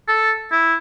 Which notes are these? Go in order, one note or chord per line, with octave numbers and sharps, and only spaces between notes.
A4
E4